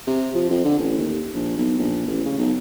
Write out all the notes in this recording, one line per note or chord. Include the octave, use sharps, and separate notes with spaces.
C3
F3
F2
D3
A1
D#2
A#1
B1
A#1
A1
C#3
B1